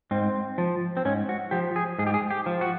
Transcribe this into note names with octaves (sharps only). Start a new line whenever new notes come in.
G#2 C4
F3
C4
G#2 C#4
F#4
F3 G4
G#4
G#2 G#4
G4
G#4
G4
F3
F#4